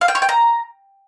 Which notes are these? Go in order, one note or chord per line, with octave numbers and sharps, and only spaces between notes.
F5
G5
C#5
G5
A#5